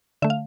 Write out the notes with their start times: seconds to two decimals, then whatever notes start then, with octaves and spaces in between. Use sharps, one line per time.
0.22 D3 A3 E5
0.30 F5